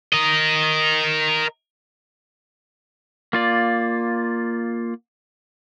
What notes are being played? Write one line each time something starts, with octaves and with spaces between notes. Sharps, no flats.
A#4 D#5
A#3 F4 D5